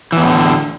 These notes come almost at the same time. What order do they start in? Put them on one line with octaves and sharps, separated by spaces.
E3 E2 A2 D3